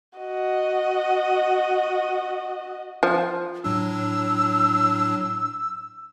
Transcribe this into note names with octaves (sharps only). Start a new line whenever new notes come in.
F#4 D#5
F3
A2 F#3 D4 E6